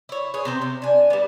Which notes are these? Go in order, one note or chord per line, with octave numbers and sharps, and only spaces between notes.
E4 C#5
G#4 B4 C#5
C3 C4 C5
C3
D4 G#5
G3 B3